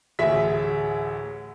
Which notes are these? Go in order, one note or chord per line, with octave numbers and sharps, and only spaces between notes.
A1 D2 G#4 E5 B6